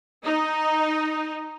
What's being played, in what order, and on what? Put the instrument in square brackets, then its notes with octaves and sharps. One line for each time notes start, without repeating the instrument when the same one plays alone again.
[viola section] D#4